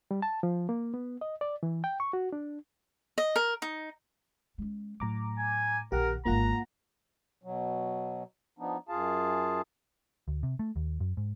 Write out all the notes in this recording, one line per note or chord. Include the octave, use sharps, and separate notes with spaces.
G3
A5
F3
A#3
B3
D#5
D5
E3
G5
C#6
F#4
D4
D#5
A#4
D#4
G#3 C#4
A2 F#3 A#5 D6
G#5
A#1 D#3 G4 A#4 F#5
D1 G#1 A#3 F4 F#5 A#5
B2 F#3
F3 B3 D4 D#4
F#2 F4 G#4 F5 A5
D2
C3
A3
D#2
F#2
G#2